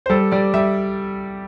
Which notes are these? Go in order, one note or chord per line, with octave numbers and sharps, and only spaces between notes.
C5
G3 A4
G3 D5
G3 E5